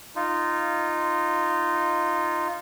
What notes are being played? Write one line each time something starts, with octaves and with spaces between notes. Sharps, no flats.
D#4 F4